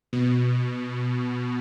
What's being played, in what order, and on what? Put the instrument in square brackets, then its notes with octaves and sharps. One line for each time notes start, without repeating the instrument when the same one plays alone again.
[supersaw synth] B2